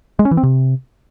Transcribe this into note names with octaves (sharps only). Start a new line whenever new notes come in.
G#3
C#4
E3
C4
C3